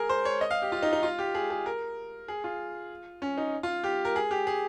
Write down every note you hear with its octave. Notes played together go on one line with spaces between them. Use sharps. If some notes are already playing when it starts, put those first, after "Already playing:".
Already playing: G#4 A#4
C5
C#5
D#5
F5
G4
F4
D#4
D#4
F4
G4
G#4
G#4
A#4
G#4
F4
C#4
D#4
F4
G4
A#4
G#4
G4
G#4